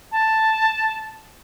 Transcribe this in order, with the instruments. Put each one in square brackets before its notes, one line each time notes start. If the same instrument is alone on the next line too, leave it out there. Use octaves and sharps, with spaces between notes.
[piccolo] A5